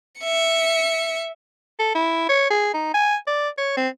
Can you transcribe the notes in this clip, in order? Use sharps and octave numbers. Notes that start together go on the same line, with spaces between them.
E5 C#7
A4
E4
C#5
G#4
D#4
G#5
D5
C#5
C4